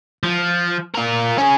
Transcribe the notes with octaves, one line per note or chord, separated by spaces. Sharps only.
F3
F4 A#4
C#4 G#4